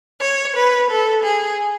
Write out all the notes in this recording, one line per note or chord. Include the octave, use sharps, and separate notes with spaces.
C#5
B4
A4
G#4